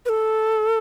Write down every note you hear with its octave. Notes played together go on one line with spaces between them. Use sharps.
B4
A4